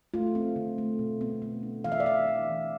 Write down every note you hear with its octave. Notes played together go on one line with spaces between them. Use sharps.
A3 F4
C4
D3
A3
B2
B3
B3
D4
E3 F5
E5
D5
E3 E5
E3
E3